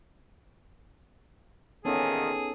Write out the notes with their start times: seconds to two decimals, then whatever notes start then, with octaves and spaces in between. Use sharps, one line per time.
1.85 E2 A#2 D#3 B3 C#4 D#4 G#4 A4